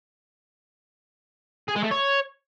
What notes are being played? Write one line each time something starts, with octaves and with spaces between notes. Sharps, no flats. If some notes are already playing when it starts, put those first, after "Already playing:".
G#4
G#3
A3
C#5